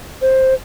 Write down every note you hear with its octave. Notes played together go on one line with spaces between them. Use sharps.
C5